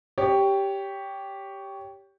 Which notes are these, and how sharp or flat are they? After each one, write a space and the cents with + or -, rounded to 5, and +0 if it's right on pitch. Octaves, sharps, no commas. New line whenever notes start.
G4 +0 C#5 +15